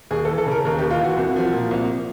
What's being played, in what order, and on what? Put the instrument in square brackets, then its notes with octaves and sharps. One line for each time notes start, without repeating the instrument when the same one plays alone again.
[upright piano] D#2 G#4
A4
E3
A4
C#3 A#4
D#2 A#4
G4
D#2
F4
E3 F#4
C2
F3
A#2
C2